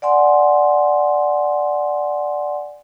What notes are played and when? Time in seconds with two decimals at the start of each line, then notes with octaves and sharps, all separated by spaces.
0.02 D5 F#5 G#5 C6